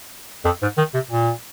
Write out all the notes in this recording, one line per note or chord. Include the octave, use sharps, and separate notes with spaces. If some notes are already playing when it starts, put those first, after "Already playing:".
F2
G#2
D#3
C3
A#2